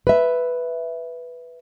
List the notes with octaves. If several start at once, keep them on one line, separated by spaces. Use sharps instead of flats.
B4 E5